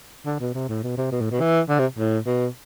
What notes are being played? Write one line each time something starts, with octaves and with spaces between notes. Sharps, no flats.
D3
B2
C3
A2
B2
C3
B2
A2
B2
E3
D3
C3
A2
B2